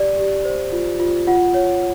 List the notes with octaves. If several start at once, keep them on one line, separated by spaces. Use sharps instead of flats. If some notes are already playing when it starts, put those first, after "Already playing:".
Already playing: G4 D5
G4
C5
F4
F4
F4 F#5
C#5